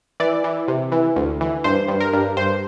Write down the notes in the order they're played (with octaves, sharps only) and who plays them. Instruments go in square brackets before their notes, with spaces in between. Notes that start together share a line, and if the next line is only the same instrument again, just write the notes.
[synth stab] E3 D5
E3
C3
E3
D2
E3
G2 C5
G2
A#4
G2
G2 C5